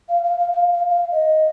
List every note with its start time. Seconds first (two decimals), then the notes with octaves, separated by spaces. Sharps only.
0.09 F5
0.24 F5
0.39 F5
0.53 F5
0.72 F5
0.89 F5
1.12 D#5